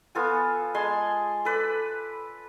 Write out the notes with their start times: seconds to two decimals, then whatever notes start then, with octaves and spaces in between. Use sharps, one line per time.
0.15 B3 F4 A4 G#5
0.74 G#3 G#5 A5 C6
1.45 A4 B4 D5